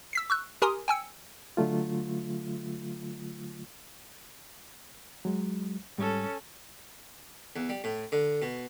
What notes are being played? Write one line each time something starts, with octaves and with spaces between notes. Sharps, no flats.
E6 B6 C7
C#6 E6 F#6
G4 A#4 G#5 A#5 C6 D#6
G5 G#5 E6 C#7
D3 F#3 A3 F4
F#3 G#3
G#2 G3 C#4 A4
E2
G3
A2
D3
B2